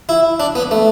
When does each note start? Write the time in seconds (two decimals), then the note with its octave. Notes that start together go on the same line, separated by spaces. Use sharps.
0.09 E4
0.40 D4
0.55 B3
0.71 A3